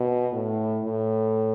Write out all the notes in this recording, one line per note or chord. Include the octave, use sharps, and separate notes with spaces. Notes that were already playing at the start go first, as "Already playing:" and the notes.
Already playing: B2
A2
A2